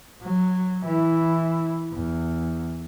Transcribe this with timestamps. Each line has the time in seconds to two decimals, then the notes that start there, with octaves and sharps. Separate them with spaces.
0.22 F#3
0.85 E3 E4
1.92 E2